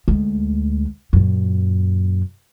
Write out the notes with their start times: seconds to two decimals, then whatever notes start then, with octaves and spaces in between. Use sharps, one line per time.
0.08 D2 G#3
1.13 F#2 A#2